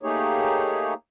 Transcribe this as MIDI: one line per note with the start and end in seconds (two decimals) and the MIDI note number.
0.03 0.94 57
0.03 0.94 58
0.03 0.94 63
0.03 0.94 67
0.03 0.94 68
0.03 0.94 73